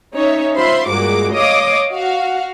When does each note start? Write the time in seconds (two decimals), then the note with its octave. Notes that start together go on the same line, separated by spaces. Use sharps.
0.15 C#4 D#4 C#5 E5
0.56 F4 C5 E5 B5 C6
0.89 G2 A#2 G#3 F#4 D6
1.33 C#5 D#5 F5 D6 D#6
1.92 F#4 F5